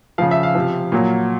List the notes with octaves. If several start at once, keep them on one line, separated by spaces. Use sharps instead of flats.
C#3 F3 F5
E5
F5
C3 F3
A#2 F#3